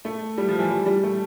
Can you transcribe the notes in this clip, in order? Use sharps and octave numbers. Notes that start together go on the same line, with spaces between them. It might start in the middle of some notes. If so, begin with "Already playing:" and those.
A3
G3
F3
E3
G3
G3
A3